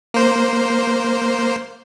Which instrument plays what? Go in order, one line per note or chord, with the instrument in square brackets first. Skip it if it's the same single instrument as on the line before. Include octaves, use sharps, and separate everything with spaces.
[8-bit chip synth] A#3 C5